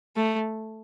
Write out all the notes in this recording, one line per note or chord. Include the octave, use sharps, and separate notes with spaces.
A3